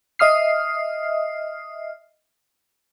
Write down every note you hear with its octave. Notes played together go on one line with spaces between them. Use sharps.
D#5 E5 D#6 F6 C7